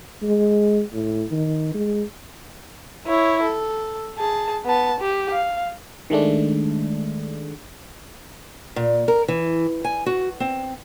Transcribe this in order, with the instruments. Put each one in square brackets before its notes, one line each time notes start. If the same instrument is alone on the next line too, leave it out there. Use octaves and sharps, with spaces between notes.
[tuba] G#3
A2
D#3
G#3
[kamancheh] E4 C#5
A4
G#4 A5
B3 A5
G4
F5
[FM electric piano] D#3 G#3 A3 D4
[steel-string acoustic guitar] A#2
A#4
E3
G#5
F#4
C4